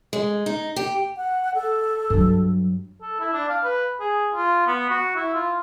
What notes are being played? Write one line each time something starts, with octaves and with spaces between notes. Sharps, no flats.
G#3
D#4
G4
F#5
A4
G2 F#3
A4
E4
D4
F5
B4
G#4
F4
B3
F#4
E4
F4